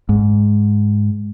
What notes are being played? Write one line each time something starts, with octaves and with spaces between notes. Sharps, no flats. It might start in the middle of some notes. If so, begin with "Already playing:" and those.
G#2